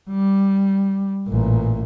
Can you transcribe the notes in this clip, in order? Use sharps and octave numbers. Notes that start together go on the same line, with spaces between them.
G3
A1 A#2